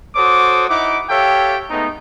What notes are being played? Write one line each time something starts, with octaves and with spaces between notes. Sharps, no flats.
F#4 A4 C5 C#5 D6 D#6
D#4 E4 F#5 D6
G4 A4 C#5 E5 F5 G5
G#3 A3 B3 D#4